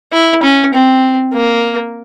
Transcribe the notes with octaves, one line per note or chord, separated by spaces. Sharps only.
E4
C#4
C4
A#3